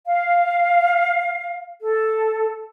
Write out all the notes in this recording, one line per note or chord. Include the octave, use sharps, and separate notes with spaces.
F5
A4